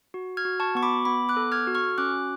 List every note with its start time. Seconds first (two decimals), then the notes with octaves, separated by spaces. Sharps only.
0.14 F#4
0.37 F6 G#6
0.45 F#4
0.60 A5 C#6
0.75 B3 C#6
0.83 B5 D6
1.05 B3 B5 D6
1.29 D6 F#6
1.37 A4
1.52 F6 G#6
1.67 F#4
1.75 C#6 F6
1.98 C#4 D6 F#6